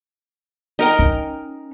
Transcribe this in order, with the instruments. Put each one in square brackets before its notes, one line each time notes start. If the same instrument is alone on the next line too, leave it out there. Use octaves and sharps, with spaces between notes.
[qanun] D#4 A#4 G5
[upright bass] C#4